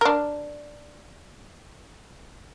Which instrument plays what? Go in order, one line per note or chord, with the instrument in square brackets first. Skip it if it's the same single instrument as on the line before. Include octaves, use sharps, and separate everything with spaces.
[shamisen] D4 A#4